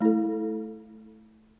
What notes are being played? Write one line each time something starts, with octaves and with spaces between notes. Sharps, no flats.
A3 E4 A4